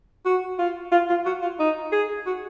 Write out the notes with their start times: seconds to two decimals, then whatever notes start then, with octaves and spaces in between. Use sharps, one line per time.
0.25 F#4
0.58 F4
0.91 F4
1.09 F4
1.25 F#4
1.42 F4
1.59 D#4
1.92 G#4
2.26 F#4